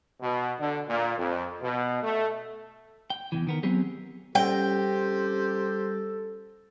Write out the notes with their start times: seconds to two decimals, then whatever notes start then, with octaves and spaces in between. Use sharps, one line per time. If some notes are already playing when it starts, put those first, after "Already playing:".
0.21 B2
0.60 D3
0.89 A#2
1.18 F2
1.63 B2
2.03 A3
3.10 G5
3.32 E2 B2 E3
3.47 D#3 B3 A#4
3.63 F#3 B3 C4 G4 G#4
4.35 G3 C#4 G4 A4 C5 G5 A#6